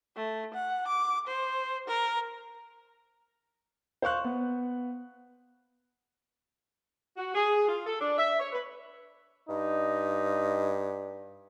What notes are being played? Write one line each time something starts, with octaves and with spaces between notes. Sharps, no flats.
A3
F#5
D6
C5
A#4
C5 F5 C#6 F#6
B3
F#4
G#4
F4
A4
D4
E5
C#5
B4
G2 D#4